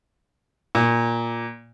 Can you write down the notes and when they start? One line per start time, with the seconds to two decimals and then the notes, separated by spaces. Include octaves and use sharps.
0.75 A#2